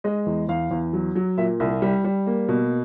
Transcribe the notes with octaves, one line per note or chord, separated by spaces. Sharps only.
G#3 D#5
E2
E2 F5
E2
F#3
F#3
A#2 E5
C2
G3
G3
A#3
B2